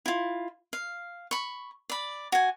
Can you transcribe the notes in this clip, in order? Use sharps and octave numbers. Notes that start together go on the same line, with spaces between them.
E4 F4
F5
B5 C#6
D5 B5
F#4 G#5